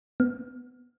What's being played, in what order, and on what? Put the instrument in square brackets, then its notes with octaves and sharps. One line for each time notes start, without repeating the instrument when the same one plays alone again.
[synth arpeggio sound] B3